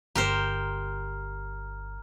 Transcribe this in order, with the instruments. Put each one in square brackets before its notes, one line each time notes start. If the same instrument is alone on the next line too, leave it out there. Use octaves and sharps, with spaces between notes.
[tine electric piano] G1 [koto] G4 A#4 C5 [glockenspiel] A#5 F6